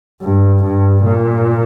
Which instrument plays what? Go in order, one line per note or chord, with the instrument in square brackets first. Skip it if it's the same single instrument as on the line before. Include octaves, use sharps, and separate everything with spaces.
[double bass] G2
G2
A#2